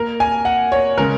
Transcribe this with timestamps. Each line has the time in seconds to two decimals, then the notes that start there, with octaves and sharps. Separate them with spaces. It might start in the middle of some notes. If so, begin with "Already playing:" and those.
Already playing: A#3 A#4
0.20 G#5
0.45 F#5
0.72 C#5
0.98 C#3 G#3 C#4 A#4